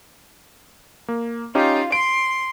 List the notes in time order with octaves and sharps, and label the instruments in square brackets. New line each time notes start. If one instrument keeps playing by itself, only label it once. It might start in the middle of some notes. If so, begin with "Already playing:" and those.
[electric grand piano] A#3
[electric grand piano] C#4 D#4 G4 [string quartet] F4
[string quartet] C6 [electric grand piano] D7